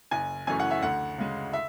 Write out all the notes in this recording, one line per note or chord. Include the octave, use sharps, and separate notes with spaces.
F#1 G#5
F#2 E3 A3 C#4 G#5
F#5
E5
D2 F#5
C#3 G#3
E5